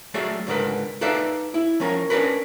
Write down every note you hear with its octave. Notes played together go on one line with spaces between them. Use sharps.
F#3 A3 G#4 D5 E5
C#2 G#2 D3 A#4 B4
D#4 A4 B4 D5 E5 F5
E4
F3 C#4 A#4
C#4 D4 E4 A#4 B4